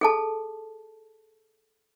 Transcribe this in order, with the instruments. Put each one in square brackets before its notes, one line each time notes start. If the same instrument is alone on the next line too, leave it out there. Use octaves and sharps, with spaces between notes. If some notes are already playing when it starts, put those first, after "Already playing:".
[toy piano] G#4 A4 A5